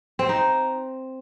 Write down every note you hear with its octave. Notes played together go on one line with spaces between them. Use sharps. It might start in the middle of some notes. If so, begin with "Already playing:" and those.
C4
D#4